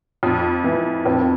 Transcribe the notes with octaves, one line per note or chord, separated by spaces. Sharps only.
F2
E3
F2 C4